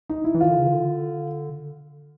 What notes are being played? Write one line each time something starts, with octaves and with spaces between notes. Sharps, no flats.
D#4
E4
E3
D#3 F4
D3
C#3
D#3
D3